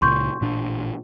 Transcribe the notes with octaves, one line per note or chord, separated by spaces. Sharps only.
C#2 A#2 C#3 C6 C#6 G6
A1 A#2 D4